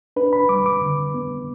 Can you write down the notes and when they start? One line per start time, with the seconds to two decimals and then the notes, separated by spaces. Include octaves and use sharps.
0.16 D4 B4
0.33 B5
0.49 G3 D6
0.66 D6
0.82 D3
1.14 B3